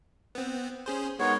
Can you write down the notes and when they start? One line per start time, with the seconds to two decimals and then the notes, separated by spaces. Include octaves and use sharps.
0.35 B3 C4
0.86 C#4 G#4 C5
1.19 G#3 B3 D#4 A#4 C#5